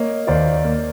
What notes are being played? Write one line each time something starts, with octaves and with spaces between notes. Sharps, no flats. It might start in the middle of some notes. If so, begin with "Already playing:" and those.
Already playing: A#3 C#5 D#5
D#2 C5 D5
A#3